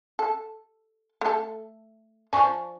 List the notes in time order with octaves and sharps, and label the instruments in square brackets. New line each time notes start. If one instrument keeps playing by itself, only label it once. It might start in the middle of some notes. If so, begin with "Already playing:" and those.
[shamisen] A4
A3 A4
[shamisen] F3 D4 [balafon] G#5 C#6